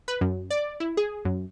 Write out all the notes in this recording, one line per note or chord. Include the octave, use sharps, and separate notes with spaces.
B4
F#2
D5
E4
G#4
F#2